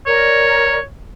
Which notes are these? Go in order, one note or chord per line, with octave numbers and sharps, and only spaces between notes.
A#4 C#5 D5